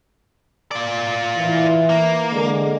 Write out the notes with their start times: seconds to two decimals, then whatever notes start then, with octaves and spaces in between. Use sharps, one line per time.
0.71 F4 D5
1.37 E3
1.89 A#3
2.32 D3 G#3